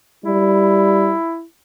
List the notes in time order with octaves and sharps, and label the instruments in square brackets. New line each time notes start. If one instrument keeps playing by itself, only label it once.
[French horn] G3 [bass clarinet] E4